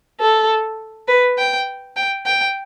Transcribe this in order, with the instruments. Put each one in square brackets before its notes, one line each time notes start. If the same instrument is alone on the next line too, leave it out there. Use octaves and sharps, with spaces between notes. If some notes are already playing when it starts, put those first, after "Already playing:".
[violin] A4
B4
G5
G5
G5